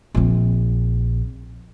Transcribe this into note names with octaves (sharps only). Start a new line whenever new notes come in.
A#1 C4